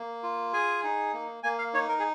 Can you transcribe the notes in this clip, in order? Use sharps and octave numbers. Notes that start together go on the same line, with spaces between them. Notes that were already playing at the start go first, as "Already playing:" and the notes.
Already playing: A#3
F4
G#4 G#5
D#4
A#3
A#3 G#5
F5
D#4 C#5
A#4
G#4